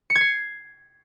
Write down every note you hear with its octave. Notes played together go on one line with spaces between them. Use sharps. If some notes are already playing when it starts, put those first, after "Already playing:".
C#7
G#6
C7